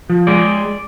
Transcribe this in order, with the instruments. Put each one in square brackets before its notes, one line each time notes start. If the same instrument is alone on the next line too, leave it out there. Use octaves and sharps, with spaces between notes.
[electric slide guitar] F3
G#3 D5